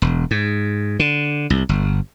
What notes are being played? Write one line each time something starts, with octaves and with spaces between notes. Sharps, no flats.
E1
G#2
D3
C2
G1